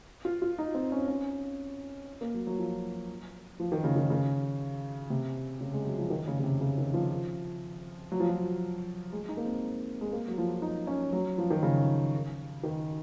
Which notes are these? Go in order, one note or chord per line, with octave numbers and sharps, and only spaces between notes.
F4
F4
D#4
C4
C#4
C#4
A#3
F#3
F#3
F3
F3
D#3
C#3
D#3
C#3
C3
C#3
G#3
F#3
F3
D#3
C#3
C#3
C3
C#3
D#3
F3
F#3
F3
F#3
G#3
D#4
A#3
C4
G#3
A#3
F#3
F3
D#4
C#4
F#3
F3
D#3
C#3
D#3